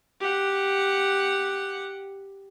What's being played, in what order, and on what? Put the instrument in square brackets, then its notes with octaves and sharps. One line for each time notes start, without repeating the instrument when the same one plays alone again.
[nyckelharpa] G4 F#5